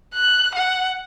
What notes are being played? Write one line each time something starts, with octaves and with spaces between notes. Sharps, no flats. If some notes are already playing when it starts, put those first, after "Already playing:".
F#6
F#5